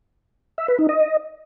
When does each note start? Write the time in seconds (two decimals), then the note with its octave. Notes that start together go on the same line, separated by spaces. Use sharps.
0.58 E5
0.68 B4
0.79 D#4
0.89 D#5